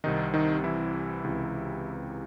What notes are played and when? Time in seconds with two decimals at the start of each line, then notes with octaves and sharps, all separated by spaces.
0.04 C2 C3 D#3 D#4
0.34 D#3 D#4
0.64 E3 E4
1.24 C#2 C3 E3